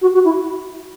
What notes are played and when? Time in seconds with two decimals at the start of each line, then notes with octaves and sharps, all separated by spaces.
0.01 F#4
0.14 F#4
0.25 E4